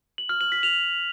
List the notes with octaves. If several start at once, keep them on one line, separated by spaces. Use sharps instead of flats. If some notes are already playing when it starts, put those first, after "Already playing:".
F#7
F6
F#7
B6
F7